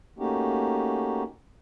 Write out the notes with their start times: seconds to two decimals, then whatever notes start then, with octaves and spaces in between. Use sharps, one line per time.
0.19 A3 A#3 C#4 D#4 F#4 G4